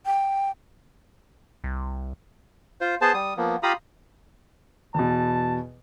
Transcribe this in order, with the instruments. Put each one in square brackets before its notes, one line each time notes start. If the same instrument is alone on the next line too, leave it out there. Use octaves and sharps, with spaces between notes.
[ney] G5
[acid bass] C2
[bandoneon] F4 C5
B3 G#4 C5 A5
G3 D#6
F3 A#3 B3
F4 G4 F5 A#5 B5 D#6
[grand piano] E2 B2 [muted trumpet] A5